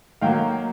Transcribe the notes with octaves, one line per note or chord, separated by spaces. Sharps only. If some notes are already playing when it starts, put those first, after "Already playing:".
D#3 F#3 A#3 F5 G5